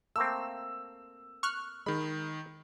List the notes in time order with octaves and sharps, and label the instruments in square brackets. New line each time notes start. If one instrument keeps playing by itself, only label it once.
[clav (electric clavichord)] A3 A#3 C4 [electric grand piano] E6
[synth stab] C#6 F6 F#6
[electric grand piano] D#3 B5 [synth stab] G#3